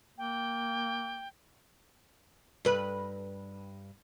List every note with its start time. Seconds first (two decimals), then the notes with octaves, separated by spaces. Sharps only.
0.18 A#3 G5
2.65 G2 B4